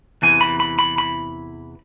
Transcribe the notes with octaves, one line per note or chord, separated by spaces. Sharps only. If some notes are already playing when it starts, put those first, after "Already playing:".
E2 C3 E3 G#5
B5
B5
B5
B5